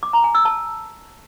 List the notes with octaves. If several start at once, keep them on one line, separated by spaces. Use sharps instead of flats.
D6
A#5
G#5
E6
A5